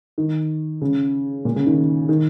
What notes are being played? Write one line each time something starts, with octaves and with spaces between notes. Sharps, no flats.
D#3
C#3
A#2
C#3
D#3
D#3